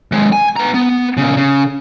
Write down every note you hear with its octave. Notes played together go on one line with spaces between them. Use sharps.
D#2 G#3
G#5
B3 A#5
B3
A#2 C#3
C#3